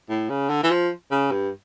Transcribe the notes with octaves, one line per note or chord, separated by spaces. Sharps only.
A2
C#3
D3
E3
F3
C#3
G2